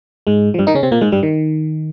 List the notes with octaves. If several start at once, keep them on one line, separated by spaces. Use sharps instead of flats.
G#2 G#3
F3
G2 G3
D#3 D#4
C#3 C#4
C3 C4
A#2 A#3
G#2 G#3
G2 G3
D#3